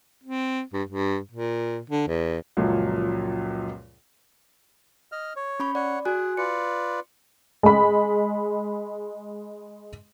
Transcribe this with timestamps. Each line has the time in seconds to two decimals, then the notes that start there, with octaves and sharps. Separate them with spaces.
0.24 C4
0.73 G2
0.89 G2
1.31 A#2
1.90 D3
2.08 E2
2.57 C#2 F#2 A#2 F3 F#3
5.12 D#5 F6
5.36 C#5
5.60 C#4 B5 C#6
5.75 C#5 D5 F#5
6.05 F#4 G#4 G#5 F#6
6.37 F4 B4 D5 C#7
7.63 G#3 B5